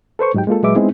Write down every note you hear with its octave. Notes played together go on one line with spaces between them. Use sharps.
A4 B4 C5 C#6
G#2 F#3 D#4 G4 G5
G#3 A#3 F4 A4
A#2 F#3 G#3 B4 E5 D6
G#3 B3 C4 D#4 E4 G#4